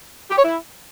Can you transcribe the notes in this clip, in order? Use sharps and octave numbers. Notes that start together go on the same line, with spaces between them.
G4
C#5
E4